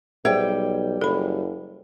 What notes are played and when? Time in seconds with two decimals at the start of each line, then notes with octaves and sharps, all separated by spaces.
0.25 B1 G3 G#4 C5 E5 G5
1.01 F#1 A4 B5